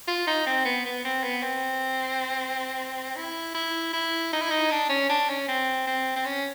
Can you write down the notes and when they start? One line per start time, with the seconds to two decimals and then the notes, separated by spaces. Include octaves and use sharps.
0.08 F4
0.27 D#4
0.46 C4
0.65 B3
0.85 B3
1.05 C4
1.23 B3
1.43 C4
3.16 E4
3.54 E4
3.93 E4
4.33 D#4
4.42 E4
4.51 D#4
4.71 D4
4.90 C#4
5.09 D4
5.29 C#4
5.48 C4
5.87 C4
6.16 C4
6.25 C#4